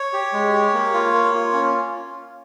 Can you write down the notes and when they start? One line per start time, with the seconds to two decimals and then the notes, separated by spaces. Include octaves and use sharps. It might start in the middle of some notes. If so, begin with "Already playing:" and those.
Already playing: C#5
0.13 G4
0.33 G#3
0.54 G4
0.73 A#3
0.94 F4
1.13 A#3
1.34 F4
1.53 C#4